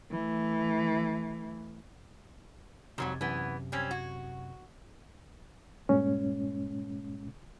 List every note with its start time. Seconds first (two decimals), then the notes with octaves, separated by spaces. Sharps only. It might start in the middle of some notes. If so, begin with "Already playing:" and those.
0.12 E3 A3
2.98 F2 G#2 C3 F#3 G3
3.21 F#2 C3 E3 B3
3.72 G3 C4 C#4
3.91 F#4
5.89 G2 A#2 G#3 C#4